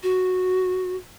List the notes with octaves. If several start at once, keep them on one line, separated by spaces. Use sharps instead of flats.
F#4